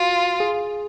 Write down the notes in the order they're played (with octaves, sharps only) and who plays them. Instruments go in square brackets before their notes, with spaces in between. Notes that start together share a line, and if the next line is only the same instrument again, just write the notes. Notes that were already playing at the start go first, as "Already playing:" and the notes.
Already playing: [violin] F4 [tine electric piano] F#4
[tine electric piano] G#4